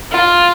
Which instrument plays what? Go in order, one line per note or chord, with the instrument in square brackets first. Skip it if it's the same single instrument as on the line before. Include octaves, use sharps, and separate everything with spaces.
[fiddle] F4